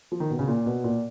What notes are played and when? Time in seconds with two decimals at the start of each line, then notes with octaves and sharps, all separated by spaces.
0.12 F3
0.20 D#3
0.30 B2
0.39 C#3
0.48 A#2
0.66 B2
0.84 A#2